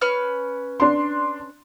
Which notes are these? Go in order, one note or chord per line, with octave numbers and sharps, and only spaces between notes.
C#4 B4 F6
D4 C6